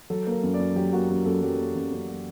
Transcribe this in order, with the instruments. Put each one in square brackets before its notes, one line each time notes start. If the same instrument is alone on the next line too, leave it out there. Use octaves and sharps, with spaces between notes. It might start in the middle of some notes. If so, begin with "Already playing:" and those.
[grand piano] F#3 A4
A#3 A#4
F#2
D5
F#2
F#3 G4
A#3 F#4
F#2 G4
F#2 A4
F#3 G4
A#3
F#2
F#2
F#3